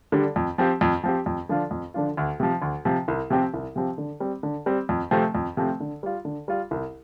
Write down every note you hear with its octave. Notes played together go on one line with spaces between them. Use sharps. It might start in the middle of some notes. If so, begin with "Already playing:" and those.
D3 G3 D4
F2
F3 C4 G4
F2
F3 C4 G4
F2
D3 F3 D4 F4
F2
D3 F3 D4 F4
D2
C3 F3
D2
C3 F3
C2
C3 F3 C4 G4
C2
C3 F3 C4 G4
D3
G3 C4
D3
G3 C4
F2
C3 F3 A3 C4
F2
C3 F3 A3 C4
D3
G3 F4
D3
G3 F4
C2